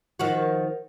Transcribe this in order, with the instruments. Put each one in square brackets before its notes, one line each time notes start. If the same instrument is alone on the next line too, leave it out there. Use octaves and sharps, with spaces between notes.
[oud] D#3 F3 F#4